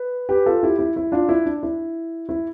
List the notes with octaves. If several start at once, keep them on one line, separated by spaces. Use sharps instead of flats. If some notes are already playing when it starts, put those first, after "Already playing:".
Already playing: B4
G4 B4
F4 A4
E4 G4
E4
E4
D4 F4
E4
D4
E4
E4